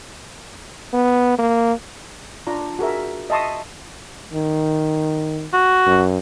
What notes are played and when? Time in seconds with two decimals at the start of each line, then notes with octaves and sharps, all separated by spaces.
0.94 B3
1.39 A#3
2.47 D4 F4 A#5
2.79 F#4 G#4 A#4 E5
3.30 D#5 E5 A5 C6 C#6 D#6
4.33 D#3
5.53 F#4
5.87 F#2